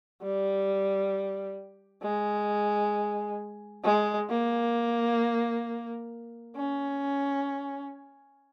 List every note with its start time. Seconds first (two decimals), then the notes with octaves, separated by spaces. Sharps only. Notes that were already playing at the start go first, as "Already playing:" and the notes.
0.22 G3
2.03 G#3
3.84 G#3
4.30 A#3
6.57 C#4